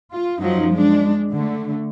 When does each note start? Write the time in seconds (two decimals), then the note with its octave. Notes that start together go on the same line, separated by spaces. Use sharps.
0.12 F4
0.41 F#2 F3 F#3 D#4
0.72 G#3 D4
1.31 D3 A3